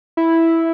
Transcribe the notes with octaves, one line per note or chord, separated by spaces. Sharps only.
E4